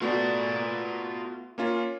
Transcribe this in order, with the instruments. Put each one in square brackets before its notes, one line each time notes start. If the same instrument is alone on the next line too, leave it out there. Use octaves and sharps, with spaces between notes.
[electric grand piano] A3 B3 F#4 [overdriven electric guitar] F4 D5
[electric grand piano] A#3 C#4 F4